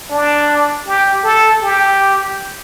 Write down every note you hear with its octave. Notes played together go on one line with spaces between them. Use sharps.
D4
G4
A4
G4